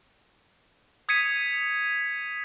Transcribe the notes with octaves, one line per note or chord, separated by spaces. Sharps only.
D#6 G#6 B6 C#7 D#7